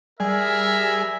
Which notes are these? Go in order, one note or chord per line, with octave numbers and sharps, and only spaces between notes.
G3 G#4 A#4 E5